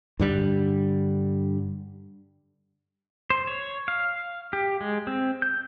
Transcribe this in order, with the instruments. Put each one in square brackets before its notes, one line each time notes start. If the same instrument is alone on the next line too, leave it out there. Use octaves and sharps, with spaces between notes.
[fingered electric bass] G2 D3 G3
[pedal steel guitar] C5
C#5
F5
G4
G#3
C4
G6